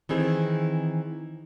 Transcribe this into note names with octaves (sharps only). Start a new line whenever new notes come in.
D#3 E3 C4 G#4